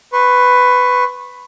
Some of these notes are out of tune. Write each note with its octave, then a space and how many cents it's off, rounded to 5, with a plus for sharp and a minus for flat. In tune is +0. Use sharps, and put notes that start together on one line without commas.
B4 +10 C#6 -35